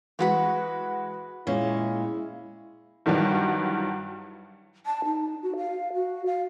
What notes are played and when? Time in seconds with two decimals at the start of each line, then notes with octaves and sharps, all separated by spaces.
0.19 E3 G#3 F#4 B4 F#5 B5
1.47 A#2 G#3 C#4 E4
3.06 G2 D#3 E3 F#3 G3
4.86 A5
5.05 D#4
5.42 F#4
5.57 F5
5.94 F#4
6.26 F5